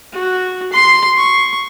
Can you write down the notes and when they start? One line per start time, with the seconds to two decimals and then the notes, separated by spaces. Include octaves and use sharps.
0.13 F#4
0.73 C6
1.17 C#6